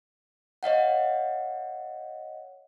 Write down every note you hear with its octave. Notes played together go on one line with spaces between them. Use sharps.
C#5 D#5 F5 F#5